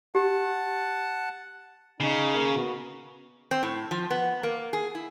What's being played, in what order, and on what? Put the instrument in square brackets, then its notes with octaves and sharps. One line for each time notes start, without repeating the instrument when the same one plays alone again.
[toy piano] G4 [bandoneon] F#5 A5
[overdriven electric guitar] C#3 [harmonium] D#4
[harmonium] A#3 A#4
B3 F#4
[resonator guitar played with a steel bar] C4
A2
F3
B3
A#3
G#4
E4